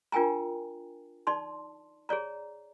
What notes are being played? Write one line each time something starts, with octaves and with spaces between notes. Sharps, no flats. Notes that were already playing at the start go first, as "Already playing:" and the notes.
D4 F4 A#4 G5 G#5 A#5
D#4 D5 A5 C6
G#4 C#5 D5 A#5